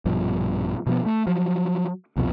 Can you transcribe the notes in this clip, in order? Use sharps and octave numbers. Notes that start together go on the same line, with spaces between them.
A#1 G2 B2 F3
B2 F3 B3
A3
F3 F#3
C2 F2 B2 F3